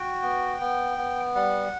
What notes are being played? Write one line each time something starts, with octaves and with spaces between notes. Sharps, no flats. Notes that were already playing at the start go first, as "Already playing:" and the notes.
Already playing: F#4 G5
B3
B3
B3
G3 F#5